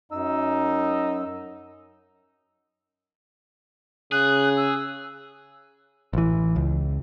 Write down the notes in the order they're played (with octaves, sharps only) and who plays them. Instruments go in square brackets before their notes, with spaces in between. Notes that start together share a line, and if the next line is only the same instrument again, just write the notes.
[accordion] F#2 E6 [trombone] D#4
[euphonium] C#3 [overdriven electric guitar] G#4 [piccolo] F#6
[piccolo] E6
[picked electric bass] A1 E3
C#2